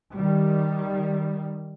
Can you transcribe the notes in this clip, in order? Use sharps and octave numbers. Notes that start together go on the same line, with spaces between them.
D#3 G3